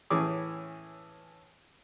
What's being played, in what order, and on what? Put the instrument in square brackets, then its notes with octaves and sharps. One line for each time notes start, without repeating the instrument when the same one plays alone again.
[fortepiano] A2 E3 C#4 G#4 D6